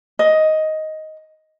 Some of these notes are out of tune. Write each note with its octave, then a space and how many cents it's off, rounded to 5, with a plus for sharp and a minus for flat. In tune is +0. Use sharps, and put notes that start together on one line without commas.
D#5 +10